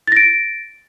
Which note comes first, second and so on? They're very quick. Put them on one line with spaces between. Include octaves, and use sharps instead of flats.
A6 A#6 D7